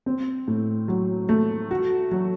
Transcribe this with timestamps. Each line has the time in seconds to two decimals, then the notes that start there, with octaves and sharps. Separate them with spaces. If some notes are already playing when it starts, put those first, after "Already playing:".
0.06 C4
0.48 A2
0.88 F#3
1.29 A3
1.71 F#4
2.11 F#3